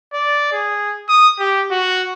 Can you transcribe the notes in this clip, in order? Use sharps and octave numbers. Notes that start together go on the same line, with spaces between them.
D5
G#4
D#6
G4
F#4